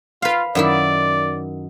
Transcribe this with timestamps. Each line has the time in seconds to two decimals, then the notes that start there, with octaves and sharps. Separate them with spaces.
0.22 F4 B4 F5
0.55 F#2 D#3 E4 D5